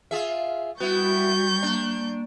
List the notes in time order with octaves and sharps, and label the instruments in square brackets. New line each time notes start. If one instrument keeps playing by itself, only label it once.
[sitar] F4 G#4 E5
[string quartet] G3 C#6 G6 [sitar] B3 E4 [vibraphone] F#4
[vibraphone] A#3 [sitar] D4